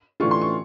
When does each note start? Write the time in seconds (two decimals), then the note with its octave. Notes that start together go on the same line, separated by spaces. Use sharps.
0.20 A2 E3 A3 D4 F4 C#6
0.31 C6
0.41 C#6